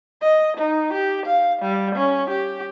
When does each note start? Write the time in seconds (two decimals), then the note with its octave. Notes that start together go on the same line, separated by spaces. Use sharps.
0.22 D#5
0.57 D#4
0.93 G4
1.26 F5
1.62 G3
1.95 C#4
2.30 G4